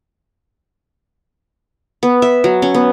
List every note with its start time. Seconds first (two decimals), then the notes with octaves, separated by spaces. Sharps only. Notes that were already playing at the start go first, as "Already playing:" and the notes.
2.03 B3
2.22 E5
2.44 F#3
2.62 C#4
2.74 B3